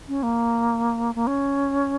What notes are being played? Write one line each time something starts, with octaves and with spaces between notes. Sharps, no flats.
C#4
A#3
A#3
C#4